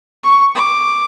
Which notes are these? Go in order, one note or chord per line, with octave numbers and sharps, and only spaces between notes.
C#6
D6